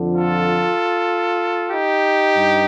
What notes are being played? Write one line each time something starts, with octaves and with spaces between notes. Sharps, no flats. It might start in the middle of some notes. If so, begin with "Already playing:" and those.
Already playing: F2 D3 F3
F4 A4
D#4 G4
G2